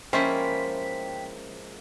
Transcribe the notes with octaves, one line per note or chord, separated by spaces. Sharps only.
F3 G#3 A#3 C#4 E4 C5 G5 B6